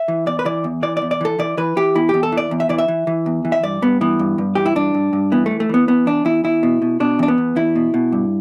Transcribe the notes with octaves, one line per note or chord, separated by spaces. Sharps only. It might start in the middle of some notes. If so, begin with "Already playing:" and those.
Already playing: E5
E3
E2 D5
B4
E3 D5
E2
E3 D5
E2 D5
D5
E3 A4
E3 D5
E3 B4
E3 G4
E2 E4
E2 G4
A4
E3
D5
E2
E5
E3 D5
E5
E3
E3
E2
E3
E5
G2 D5
G2 B3
E3 B3
G2
G2
E3 G4
E4
G2 D4
G2
G2
E3 B3
E3 A3
A3
E3 B3
E2 B3
E2 D4
E2 E4
E2 E4
B2
B2
B2 D4
E2 D4
B3
E2
E2 E4
B2
B2
G2